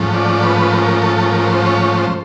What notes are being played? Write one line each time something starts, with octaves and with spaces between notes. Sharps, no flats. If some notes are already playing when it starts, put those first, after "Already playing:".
Already playing: G#2 F3 A3 C#4
D5
B4
A#4
A4
A4
A#4
C5
C#5
C5